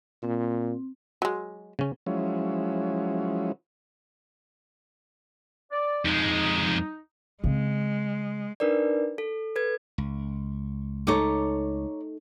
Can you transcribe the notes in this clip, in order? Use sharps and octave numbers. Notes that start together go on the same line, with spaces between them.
A#2 C4
F#3 G#3
C#3 C#4
F3 F#3 G#3 C#4 E4
D5
F2 G#3 D#4
C#3 G#3 C4
D4 D#4 A#4 B4 D5
A4
A4 B4 G#6
C#2
A3 D#4 A4 C#5 A#5 D6